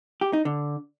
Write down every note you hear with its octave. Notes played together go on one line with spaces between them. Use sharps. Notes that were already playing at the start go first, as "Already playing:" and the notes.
G4
D#4
D3